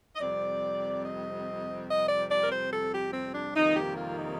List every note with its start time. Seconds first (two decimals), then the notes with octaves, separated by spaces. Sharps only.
0.16 D#5
0.21 F2 C3 G3 C4 D5
1.05 D#5
1.89 D#5
2.09 D5
2.30 D5
2.44 A#4
2.52 C5
2.72 A4
2.93 G4
3.14 C4
3.35 D4
3.55 F2 C3 D#3 G3 A#3 D#4
3.76 G4
3.97 F4
4.18 D#4